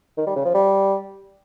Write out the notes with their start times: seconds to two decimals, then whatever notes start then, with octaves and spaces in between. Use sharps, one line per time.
0.17 D#3
0.27 G3
0.36 C#3
0.45 F3
0.54 G3